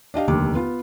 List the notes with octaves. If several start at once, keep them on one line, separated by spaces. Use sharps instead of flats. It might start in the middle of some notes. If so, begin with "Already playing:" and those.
D4 G4 D#5 F5
F1 D#2 D3 D6
B3 F4